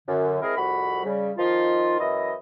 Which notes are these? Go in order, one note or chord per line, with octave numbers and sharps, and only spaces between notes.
F#2 D3
G#3 C4 E4 G#4 A#4
C2 F2 F#4 B5
C#3 G3
D#3 F3 D#4 F4
F#2 E3 E4 D#5